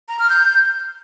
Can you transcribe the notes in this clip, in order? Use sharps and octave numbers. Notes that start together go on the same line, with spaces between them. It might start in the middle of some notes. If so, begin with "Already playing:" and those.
A#5
F6
G6